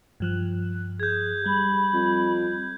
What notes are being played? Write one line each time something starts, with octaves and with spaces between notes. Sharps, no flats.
G2 F3 F#6
G#4 G6 G#6
G3 B5
F2